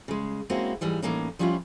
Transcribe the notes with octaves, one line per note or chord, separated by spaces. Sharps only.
C#3 G#3
G#3 A#3 C4 C#4 E4 F#4
G#2 E3 G3 G#3
A2 E3 A#3 C#4 D#4
F3 G3 C#4 D4 E4 F4